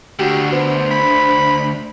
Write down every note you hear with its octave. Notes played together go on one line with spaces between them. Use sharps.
D2 D3 F#4 G4
B3 C5
B5